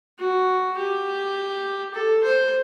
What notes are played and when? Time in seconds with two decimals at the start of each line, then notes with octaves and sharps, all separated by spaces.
0.19 F#4
0.77 G4
1.94 A4
2.24 C5